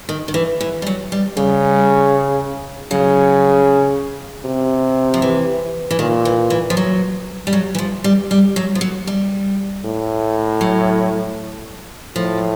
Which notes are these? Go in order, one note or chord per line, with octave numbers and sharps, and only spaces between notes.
D#3
D#3
E3
E3
G3
F#3
G3
C#3 G3
C#3 F#3
C3
F3
E3
E3
A#2 D#3
E3
E3
F3
F#3
G3
F#3
E3
F3
G3
G3
F#3
F3
F#3
G3
A2
F#3
A2 F3